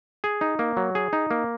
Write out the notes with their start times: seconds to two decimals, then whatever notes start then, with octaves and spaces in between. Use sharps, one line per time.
0.24 G#4
0.41 D#4
0.59 A#3
0.77 F#3
0.95 G#4
1.13 D#4
1.31 A#3